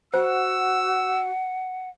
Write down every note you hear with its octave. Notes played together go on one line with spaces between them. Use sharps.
F#4 C5 F#5 E6